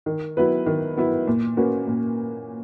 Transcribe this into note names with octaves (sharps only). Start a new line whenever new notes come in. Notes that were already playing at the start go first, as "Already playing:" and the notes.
D#3
F#3 B3 E4 B4
D#3
F#3 B3 E4 B4
A#2
A#3 C#4 F#4 B4
A#2